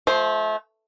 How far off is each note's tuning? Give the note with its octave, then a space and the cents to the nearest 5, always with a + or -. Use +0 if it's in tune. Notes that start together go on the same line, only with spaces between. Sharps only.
F3 +0 A3 -30 C5 +0